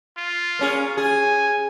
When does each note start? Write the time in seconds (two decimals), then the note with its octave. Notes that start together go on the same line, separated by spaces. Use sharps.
0.17 F4
0.59 A#3 C#4 G#4
0.97 G#4 G#5